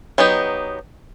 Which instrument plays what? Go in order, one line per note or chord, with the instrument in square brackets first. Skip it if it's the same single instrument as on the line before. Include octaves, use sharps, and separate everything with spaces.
[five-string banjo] F#3 B3 D#4 G4